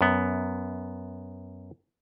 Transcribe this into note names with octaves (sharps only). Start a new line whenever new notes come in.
F#2 B3